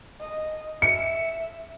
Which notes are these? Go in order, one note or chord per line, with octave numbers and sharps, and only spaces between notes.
D#5
E5 C#7